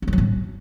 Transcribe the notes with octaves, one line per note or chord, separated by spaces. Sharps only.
B3
F3
F#3
A2